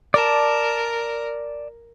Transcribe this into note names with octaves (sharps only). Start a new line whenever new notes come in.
A#4 D5 A5